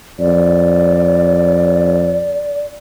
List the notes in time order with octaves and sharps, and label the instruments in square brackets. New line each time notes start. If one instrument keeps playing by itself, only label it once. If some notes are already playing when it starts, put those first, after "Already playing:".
[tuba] F2 [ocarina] D5